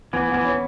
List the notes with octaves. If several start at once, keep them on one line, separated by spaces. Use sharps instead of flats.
E3 B3
B3
E3
C#4